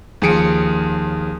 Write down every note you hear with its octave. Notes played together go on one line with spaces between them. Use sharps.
D#2 F3 G#4 C#7 D7